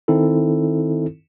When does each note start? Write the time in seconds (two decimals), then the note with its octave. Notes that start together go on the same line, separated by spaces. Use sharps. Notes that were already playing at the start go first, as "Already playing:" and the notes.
0.08 D#3 C4 D#4 E4 A4